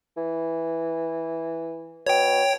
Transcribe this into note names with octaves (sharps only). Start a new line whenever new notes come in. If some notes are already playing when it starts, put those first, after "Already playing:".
E3
B2 C#5 G5